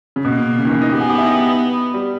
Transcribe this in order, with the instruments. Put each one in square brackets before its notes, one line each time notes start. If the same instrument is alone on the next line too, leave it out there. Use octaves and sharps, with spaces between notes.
[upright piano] C#3
[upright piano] B2 [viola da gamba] A#3
[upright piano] C#3
D#3
E3
D#4
[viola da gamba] B3 [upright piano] G4
[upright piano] G#4
G4
E4
D#4
G3